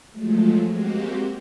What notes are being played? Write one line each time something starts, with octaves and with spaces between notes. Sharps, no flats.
F3 F#3 G#3 A3
G#3 A#3 C4 F#4 G4